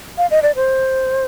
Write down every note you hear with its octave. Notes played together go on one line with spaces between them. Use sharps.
F5
D#5
D5
C5